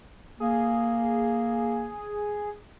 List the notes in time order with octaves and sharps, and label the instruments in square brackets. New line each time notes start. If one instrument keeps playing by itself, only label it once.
[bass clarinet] A#3 [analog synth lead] G#4